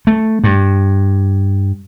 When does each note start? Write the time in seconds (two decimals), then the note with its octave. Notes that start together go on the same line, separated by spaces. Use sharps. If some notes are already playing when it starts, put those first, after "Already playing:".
0.07 A3
0.44 G2